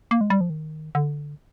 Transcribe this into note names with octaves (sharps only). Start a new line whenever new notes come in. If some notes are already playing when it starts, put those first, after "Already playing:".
A#3
G#3
G3
F3
D#3
D3